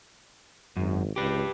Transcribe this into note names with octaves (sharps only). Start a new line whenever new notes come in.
G#1 F#2
C#2 G4 B4